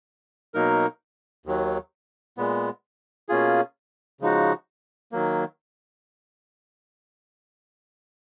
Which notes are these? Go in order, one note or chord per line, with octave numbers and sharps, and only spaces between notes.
B2 F#3 A#3 D#4 A#4
D#2 D#3 F#3
A#2 G#3 B3
B2 A#3 C#4 F4 G#4
C#3 F3 G#3 D#4 F#4
D#3 F#3 A#3